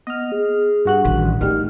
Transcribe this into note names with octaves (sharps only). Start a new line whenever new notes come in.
B3 D#5 F6
G#4
G2 F#4 F#6
A1 D#3
D#3 G3 A3 E4 F6